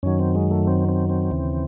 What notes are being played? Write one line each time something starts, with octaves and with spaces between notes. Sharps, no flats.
F#2 D#3 F#3 C#4
C4
G#3
A3
C4
C4
C4
D#2 C#3 E3